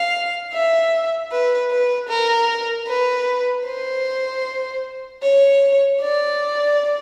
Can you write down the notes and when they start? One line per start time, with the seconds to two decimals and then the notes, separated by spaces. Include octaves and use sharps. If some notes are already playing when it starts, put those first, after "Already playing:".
Already playing: F5
0.53 E5
1.32 B4
1.71 B4
2.09 A#4
2.88 B4
3.66 C5
5.22 C#5
6.01 D5